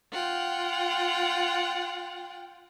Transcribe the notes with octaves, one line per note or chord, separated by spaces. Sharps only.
F4 F#5 G5